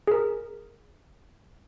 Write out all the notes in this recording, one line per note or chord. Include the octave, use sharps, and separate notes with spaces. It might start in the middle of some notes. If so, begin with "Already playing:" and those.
G#4 A#4